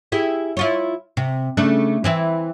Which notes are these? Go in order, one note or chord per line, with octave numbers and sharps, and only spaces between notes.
E4 G4 G#4
E4 F4 C#5
C3
C#3 A3 D4
E3 C4 E4